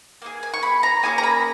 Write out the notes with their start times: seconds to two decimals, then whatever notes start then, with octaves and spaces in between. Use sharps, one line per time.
0.22 A#3 D#4 G#4
0.43 G#5
0.54 C#6
0.63 B5
0.83 A#5
1.03 A#3 C#4 G#4 G#5
1.18 A#5
1.23 B5